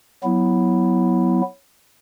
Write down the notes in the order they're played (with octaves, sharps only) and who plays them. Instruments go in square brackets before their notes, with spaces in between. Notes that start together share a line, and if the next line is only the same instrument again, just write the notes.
[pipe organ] F#3 B3 E4